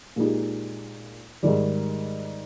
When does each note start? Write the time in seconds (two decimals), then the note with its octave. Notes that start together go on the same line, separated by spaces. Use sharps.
0.16 A#2 G#3 D#4 G4
1.43 G#2 D#3 G3